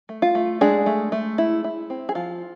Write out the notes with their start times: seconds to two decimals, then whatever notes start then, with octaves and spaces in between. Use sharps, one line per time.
0.09 A3
0.22 F4
0.35 A3
0.61 G#3 D4 G#4
0.86 A3
1.12 A3
1.38 E4
1.64 E4
1.90 C4
2.09 G#4
2.15 F3 F4